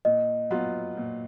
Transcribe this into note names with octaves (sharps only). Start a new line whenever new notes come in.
A#2 D#5
F#3 B3 F4
A#2